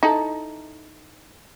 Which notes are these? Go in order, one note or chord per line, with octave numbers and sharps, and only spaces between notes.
D#4 E4 A4